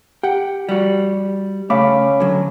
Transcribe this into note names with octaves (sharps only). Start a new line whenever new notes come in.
G4 F#5 G5
G3 F#4
C#3 A3 C#4 F5 B5 D6
D3 F#3